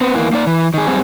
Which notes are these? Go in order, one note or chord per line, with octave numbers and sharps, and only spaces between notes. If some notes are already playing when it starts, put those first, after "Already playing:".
B3 C4
E2 E3 A#3
A#3 D#4 D5
E3
D#3 G#4
F#2 G3 C4 G#4